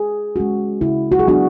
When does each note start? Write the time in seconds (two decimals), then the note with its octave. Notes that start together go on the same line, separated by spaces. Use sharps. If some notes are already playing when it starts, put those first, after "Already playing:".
Already playing: G#4
0.36 G#3 C#4 F#4
0.81 C#3 E4
1.12 F#4
1.19 G#4
1.27 F#3 B3 D4 F#4